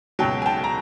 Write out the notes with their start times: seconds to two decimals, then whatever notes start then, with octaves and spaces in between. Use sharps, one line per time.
0.19 C#2 B2 F#3 G5 A5
0.42 G#5
0.46 G5 A5
0.64 A#5